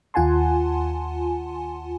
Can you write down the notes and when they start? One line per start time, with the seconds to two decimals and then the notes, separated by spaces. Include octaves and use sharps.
0.14 D#2 F4 F#5 G#5 A5 C6